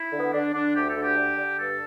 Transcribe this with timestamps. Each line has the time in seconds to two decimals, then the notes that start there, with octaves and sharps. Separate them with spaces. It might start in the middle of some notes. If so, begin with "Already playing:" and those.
Already playing: E4
0.12 D3
0.19 B3
0.33 D3 D4
0.53 D3 D4
0.75 D2 G4
0.89 A4
0.96 D3
1.03 G4
1.17 D3
1.38 D3
1.59 G2 A4